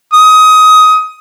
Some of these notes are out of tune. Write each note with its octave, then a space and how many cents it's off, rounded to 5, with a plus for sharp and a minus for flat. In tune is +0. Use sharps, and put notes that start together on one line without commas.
D#6 +20